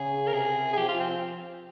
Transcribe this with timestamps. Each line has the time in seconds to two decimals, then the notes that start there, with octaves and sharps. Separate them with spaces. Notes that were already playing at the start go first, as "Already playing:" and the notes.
Already playing: C#3 G#4
0.27 A#4
0.33 C3 G#4
0.73 G#4
0.77 F3 G4
0.88 F4
1.00 C4
1.10 C4